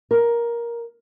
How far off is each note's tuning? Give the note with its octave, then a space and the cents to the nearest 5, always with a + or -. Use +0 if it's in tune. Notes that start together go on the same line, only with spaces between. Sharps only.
A#4 +10